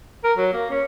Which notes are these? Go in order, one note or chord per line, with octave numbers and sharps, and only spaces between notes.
A#4
F#3
A#3
C#4